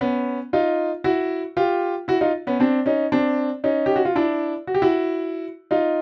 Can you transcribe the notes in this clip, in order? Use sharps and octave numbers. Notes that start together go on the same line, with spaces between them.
B3 C#4
D#4 F4
E4 F#4
F4 G4
E4 F#4
D#4 F4
B3 C#4
C4 D4
C#4 D#4
C4 D4
C#4 D#4
G4
F#4
F4
D4 E4
F#4
G4
E4 F#4
D#4 F4